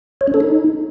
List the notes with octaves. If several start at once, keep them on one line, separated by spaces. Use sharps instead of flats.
C#5
C#4
A4
D#4